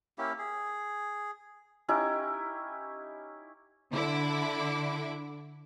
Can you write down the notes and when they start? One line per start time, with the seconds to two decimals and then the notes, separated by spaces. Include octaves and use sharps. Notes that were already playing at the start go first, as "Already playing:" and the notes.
0.18 A#3 C#4 E4 G4
0.39 G#4
1.88 C#4 D#4 E4 G4
3.91 D3 E4 D6